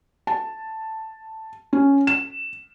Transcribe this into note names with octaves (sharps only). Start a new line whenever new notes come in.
A5
C#4
E7